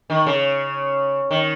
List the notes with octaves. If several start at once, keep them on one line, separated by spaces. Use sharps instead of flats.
D#3
C#3
D#3